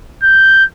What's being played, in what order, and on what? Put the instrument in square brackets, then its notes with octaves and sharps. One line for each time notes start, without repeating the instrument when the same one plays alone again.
[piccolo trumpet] G6